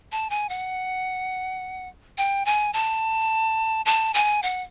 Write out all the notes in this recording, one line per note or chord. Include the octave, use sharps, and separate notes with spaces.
A5
G#5
F#5
G5
G#5
A5
A5
G#5
F#5